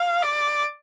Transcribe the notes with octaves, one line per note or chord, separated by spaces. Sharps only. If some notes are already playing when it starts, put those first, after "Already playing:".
Already playing: F5
D5